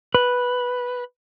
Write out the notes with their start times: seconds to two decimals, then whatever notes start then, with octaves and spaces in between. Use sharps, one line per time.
0.15 B4